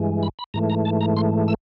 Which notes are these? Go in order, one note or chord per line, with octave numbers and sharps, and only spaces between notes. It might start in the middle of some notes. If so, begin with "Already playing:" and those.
Already playing: G2 E3 G#3
B5
B5
G#2 E3 A3 A#5
A#5
A5
A#5
C6
E6